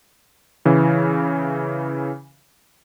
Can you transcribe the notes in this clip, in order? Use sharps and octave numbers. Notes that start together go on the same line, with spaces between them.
C#3 E3